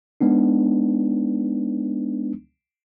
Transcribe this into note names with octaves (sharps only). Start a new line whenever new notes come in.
G#3 B3 D4 D#4